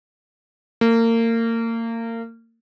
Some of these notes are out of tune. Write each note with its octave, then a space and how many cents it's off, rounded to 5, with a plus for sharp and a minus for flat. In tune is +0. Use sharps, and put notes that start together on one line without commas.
A#3 -30